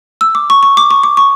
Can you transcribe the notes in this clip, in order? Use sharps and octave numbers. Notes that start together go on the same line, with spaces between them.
E6
D6
C#6
C#6
D6
C#6
D6
C#6